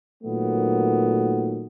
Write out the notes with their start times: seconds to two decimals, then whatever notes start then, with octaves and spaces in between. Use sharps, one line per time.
0.23 A#2 D#3 F#3 A3 B3